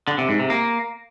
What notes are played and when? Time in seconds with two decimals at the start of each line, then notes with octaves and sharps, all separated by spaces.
0.08 D3
0.18 C3
0.29 G#2
0.39 C3
0.50 A#3